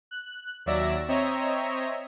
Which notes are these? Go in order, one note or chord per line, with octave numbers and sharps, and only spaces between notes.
F#6
D#2 F#3 D5 E5 E6 A#6
C4 C#5 D#5 E5 A#5